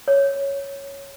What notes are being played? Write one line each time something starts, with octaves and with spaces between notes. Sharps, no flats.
C#5